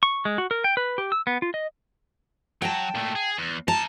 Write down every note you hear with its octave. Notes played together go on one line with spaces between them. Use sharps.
C#6
G#3
F#4
A#4
G5
B4
G4
E6
B3
F4
D#5
F#3 G5 A5
A#2 A3
G#4
E2
E3 A5 A#5